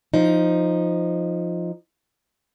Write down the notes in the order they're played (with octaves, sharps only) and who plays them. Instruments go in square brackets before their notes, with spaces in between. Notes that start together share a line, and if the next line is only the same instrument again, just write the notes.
[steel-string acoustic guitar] F3 D#4